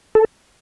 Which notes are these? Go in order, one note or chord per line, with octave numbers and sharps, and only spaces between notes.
A4